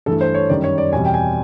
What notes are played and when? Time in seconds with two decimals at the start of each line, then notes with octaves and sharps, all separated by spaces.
0.06 G2 E3 A3 A4
0.21 C5
0.34 C#5
0.49 F#2 D#3 G3 D5
0.64 C#5
0.78 D5
0.92 E2 B2 G3 C4 G#5
1.05 G5
1.14 G#5